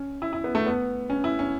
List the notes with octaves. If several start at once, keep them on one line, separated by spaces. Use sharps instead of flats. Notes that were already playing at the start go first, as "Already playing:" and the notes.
Already playing: C#4
E4
E4
B3
A3
B3
C#4
E4
C#4